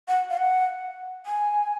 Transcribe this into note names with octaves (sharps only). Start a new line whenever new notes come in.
F#5
F5
F#5
G#5